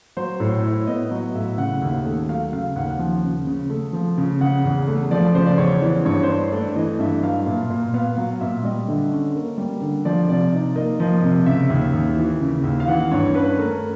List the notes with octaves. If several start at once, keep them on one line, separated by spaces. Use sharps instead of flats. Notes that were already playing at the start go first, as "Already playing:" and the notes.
F#3 C5
A2 C#5
E4 C#5
B3 D#5
F#3
A2 E5
C#3 F#5
D#2
A3
F#3 F5
C#3 F5
D#2 F#5
F3
C#3
C#3
A3
F3
C#3
C#3 F#5
E2
A3
F3 D5
C#3 C5
D5
E2 C#5
E3 D5
G2 C#5
C5
D4 C#5
A3 D5
E3 D#5
G2 E5
F#3 F5
A#2
A#2
B3 F5
F#3 F5
A#2 E5
G3 D#5
D3
C#4
A#3
G3
D3
F3 D5
C3 D5
D#4
A#3 D#5
F3 D#5
C3
C#3 E5
D#2
D#2
E3
C#3
D#2
F5
E3 F#5
G2 C#5
C#4 B4
A3 A#4